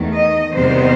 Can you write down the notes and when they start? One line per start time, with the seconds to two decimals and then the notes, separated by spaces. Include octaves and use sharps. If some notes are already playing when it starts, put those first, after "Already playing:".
Already playing: E2 D#3 A3
0.14 D#5
0.52 E2 C3 D#3 G3 B3 C5